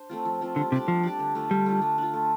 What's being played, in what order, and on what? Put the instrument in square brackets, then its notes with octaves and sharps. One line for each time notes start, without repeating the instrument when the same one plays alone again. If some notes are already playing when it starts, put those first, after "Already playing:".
Already playing: [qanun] D4 C5
A3 C4 F4
F3
A3 C4 F4
[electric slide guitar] D3 [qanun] G3
[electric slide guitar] C3 [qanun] D4 G4 D5
[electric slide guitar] F3 [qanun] G3
[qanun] D4 G4 D5
D3
A3 D4 F4
[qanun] D3 [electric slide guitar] G3
[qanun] A3 D4 F4
A3
D4 F4
A3